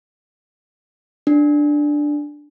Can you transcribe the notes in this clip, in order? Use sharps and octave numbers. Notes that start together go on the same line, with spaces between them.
D4